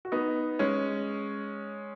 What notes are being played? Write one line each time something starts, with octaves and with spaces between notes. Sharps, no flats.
F#4
B3 D#4
G#3 C#4